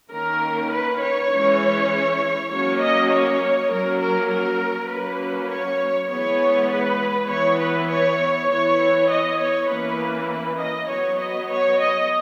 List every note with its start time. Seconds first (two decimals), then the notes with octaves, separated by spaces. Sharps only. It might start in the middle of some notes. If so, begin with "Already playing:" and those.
0.11 D#3 A#3 C#4 A#4
0.71 B4
1.01 C#5
1.31 E3 G#3 C#4
2.51 F#3 A#3 C#4 C#5
2.81 D#5
3.10 C#5
3.70 F#3 A#3 C#4 A#4
4.00 A#4
4.30 A#4
4.90 F#3 A#3 C#4 B4
5.50 C#5
6.09 E3 G#3 B3 C#5
6.69 B4
7.29 E3 B3 C#5
7.59 B4
7.90 C#5
8.49 E3 B3 C#5
9.09 D#5
9.39 C#5
9.68 E3 A#3 C#4 B4
10.29 B4
10.59 D#5
10.88 F#3 B3 C#5
11.18 D#5
11.48 C#5
11.78 D#5